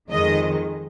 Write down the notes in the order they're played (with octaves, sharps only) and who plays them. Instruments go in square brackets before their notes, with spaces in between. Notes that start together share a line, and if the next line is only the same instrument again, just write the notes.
[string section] F2 D#3 G#3 D#5